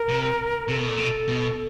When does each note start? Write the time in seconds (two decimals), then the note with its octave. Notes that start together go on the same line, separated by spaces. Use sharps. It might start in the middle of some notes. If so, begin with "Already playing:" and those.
Already playing: A#4
0.09 C3
0.69 C3 A4
0.78 B2
0.89 A#2
0.98 B2
1.28 B2